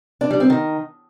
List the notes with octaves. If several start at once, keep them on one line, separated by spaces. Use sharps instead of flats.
D4
G3
C4
D#3